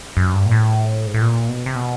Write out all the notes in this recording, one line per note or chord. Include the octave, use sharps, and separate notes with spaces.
F#2
G2
A#2
A2
G#2
A2
A#2
B2
C3
B2